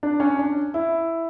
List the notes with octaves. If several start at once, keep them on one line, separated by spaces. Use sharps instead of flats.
D4
C#4
D4
E4